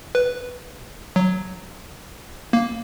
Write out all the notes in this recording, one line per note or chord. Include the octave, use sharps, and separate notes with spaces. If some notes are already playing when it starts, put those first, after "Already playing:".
B4
F#3
A#3